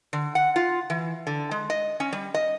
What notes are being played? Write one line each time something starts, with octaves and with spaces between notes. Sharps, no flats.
D3
F#5
F4
E3
D3
G#3
D#5
C#4
G3
D#5